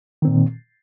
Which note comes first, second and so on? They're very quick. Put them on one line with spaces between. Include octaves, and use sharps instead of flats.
D#3 C4 A#2